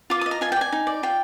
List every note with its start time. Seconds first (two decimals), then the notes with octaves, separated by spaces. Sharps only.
0.10 F4 D6
0.21 D#6
0.26 D#5
0.31 A#5
0.41 F4 G#5
0.52 G5
0.56 D5 G#5
0.72 D#4
0.87 D5
1.03 F4 G5